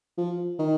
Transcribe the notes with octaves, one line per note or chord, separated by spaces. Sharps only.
F3
D#3